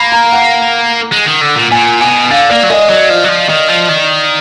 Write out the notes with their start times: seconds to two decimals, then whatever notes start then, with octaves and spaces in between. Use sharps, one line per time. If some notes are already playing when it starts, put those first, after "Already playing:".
Already playing: A#3 B5
0.12 A#5
0.32 F#5
1.12 G#3
1.26 D#3
1.41 D3
1.55 A#2
1.71 A#2 G#5
2.00 B2 G#5
2.30 D3 F5
2.50 A#3 D5
2.63 F#3
2.70 G#3 D#5
2.90 F#3 D5
3.10 F3
3.24 F#3
3.29 F3
3.49 D#3
3.68 F3
3.89 D#3